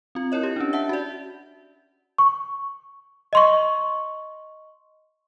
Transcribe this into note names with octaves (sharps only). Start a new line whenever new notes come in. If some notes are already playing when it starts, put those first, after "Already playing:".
C4 F4
E4 A#4 C#5 D#5
G4
C#4 D4
E5 F#5 A5
F#4 D5
C#6
D#5 C6 C#6